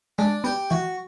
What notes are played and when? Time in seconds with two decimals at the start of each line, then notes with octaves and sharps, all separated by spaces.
0.18 G#3 D4
0.44 B3 G4
0.70 E3 F#4